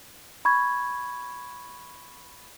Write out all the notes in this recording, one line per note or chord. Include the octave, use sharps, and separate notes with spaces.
B5 C#6 G#6